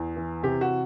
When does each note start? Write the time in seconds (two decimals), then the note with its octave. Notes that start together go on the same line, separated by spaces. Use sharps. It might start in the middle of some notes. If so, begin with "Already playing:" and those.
Already playing: E2
0.16 E3
0.43 C3 G4
0.61 F#4